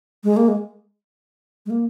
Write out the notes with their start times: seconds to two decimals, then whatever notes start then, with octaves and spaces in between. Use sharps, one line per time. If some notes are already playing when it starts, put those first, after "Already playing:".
0.24 G#3
0.37 A#3
0.48 G#3
1.66 G#3
1.70 A#3